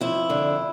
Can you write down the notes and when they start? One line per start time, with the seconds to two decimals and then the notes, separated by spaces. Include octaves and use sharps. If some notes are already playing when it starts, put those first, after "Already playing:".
0.01 F2 E4
0.30 D3